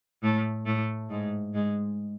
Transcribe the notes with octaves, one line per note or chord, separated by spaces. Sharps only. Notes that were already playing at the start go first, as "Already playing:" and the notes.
A2 A3
A2 A3
G#2 G#3
G#2 G#3